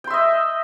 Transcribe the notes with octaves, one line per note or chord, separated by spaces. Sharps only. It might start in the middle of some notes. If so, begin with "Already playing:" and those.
D#5 E5 G5 C6